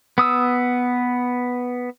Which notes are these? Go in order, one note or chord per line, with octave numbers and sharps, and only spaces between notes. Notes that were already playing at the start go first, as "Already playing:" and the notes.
B3 D#6 E6